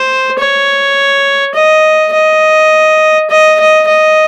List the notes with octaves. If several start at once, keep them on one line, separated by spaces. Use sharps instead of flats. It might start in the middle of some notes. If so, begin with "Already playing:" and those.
Already playing: C5
C#5
D#5
D#5
D#5
D#5
D#5